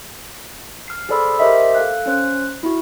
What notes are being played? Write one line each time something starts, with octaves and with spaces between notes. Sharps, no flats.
F6 C7
G#4 A4 C5 D5 B5 E6
G4 A#4 C5 D#5 E5
A4 F5 F#6
C#4 C5 F#6
E4 F#4